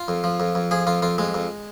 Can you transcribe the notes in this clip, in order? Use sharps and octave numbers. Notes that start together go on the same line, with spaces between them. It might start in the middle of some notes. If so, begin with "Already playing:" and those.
Already playing: F4
F2
F3
F2
F2
F3 G#4
F2 F4
F2 F4
F2 G#3
F2